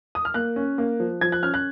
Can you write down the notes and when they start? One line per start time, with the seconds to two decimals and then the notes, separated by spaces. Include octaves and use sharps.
0.15 D#6
0.25 F6
0.34 A#3 F#6
0.56 C#4
0.78 A#3
1.00 F3
1.21 F3 G#6
1.32 F#6
1.43 C#4 F6
1.54 F#6